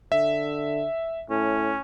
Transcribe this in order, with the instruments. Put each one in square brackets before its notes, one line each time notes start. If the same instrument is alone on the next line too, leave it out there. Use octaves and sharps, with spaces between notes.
[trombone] D3 [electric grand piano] E5
[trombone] A2 [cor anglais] C#4